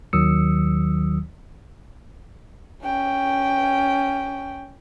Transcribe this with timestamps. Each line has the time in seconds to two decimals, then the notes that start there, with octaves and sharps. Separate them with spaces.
0.13 D#2 D#3 F#3 D#6 E6 C#7
2.84 C#4 G5